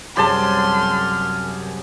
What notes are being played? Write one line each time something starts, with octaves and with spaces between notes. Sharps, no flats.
C2 F#2 G4 G#4 A5 C6 F6